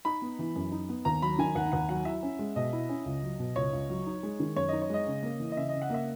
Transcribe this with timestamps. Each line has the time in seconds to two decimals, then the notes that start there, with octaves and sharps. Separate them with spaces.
0.05 D#4 B5
0.22 B3
0.39 E3
0.56 F#2
0.72 D#4
0.89 B3
1.05 D#2 A#5
1.22 F#3 B5
1.38 D#3 G#5
1.55 D#2 F#5
1.72 D#2 F#5
1.89 F#3 F#5
2.05 E4 E5
2.23 C#4
2.39 G#3
2.56 B2 D#5
2.73 E4
2.89 C#4
3.06 C#2
3.23 F#3
3.40 B2
3.56 C#2 C#5
3.73 C#2
3.89 F#3
4.06 D#4
4.23 G#3
4.40 D#3
4.56 F#2 C#5
4.69 D#4 D#5
4.82 C#5
4.90 G#3 D#5
5.06 C#3
5.23 A#3
5.40 E3
5.52 D#5
5.56 C#3 E5
5.69 C#3 D#5
5.82 F#5
5.90 A#3 E5